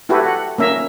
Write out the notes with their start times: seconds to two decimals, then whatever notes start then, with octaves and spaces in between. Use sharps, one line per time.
0.09 E4 F#4 G4 A4 B4
0.26 F#5
0.58 A#3 C#4 E5 A#5